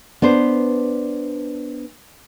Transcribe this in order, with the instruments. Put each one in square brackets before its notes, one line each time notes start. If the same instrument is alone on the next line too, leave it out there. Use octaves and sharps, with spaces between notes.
[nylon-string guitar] B3 D4 C5